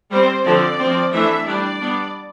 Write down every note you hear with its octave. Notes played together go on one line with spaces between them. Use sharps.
G3 C4 C5
D3 F3 C4 D5
F3 C4
E3 A3 D4 E5
G3 D4 D5
G3 B3 D4